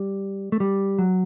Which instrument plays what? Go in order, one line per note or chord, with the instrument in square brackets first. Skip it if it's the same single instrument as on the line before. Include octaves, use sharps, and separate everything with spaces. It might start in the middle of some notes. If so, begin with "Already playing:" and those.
Already playing: [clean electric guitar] G3
A3
G3
F#3